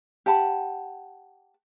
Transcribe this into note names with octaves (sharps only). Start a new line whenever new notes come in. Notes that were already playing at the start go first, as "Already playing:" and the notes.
G4 F#5 A5 B5